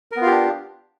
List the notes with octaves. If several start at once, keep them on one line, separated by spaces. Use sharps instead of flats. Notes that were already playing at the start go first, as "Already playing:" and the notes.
B3 D4 F4 G4 A#4